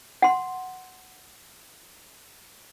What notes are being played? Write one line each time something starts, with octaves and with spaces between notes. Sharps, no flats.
F#5 C6